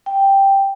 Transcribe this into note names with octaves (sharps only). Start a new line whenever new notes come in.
G5